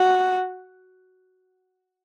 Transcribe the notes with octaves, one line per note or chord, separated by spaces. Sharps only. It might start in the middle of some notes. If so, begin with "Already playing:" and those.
Already playing: F#4